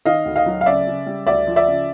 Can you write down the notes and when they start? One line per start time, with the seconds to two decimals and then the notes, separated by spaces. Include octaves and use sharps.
0.05 D#3 D#5 F5
0.26 D2
0.36 D#5 F5
0.46 F#3
0.61 F5
0.66 C#3 D5 E5
0.87 C#3
1.06 G3
1.26 D2 D5 E5
1.47 F3
1.56 D5 E5
1.67 C#3